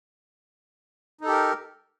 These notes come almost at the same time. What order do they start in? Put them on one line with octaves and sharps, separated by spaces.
D#4 A4 G4 A#4